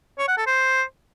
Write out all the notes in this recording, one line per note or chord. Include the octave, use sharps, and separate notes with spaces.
C#5
F#5
A4
C5